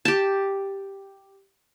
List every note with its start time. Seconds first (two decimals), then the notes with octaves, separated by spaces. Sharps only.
0.05 G4 A5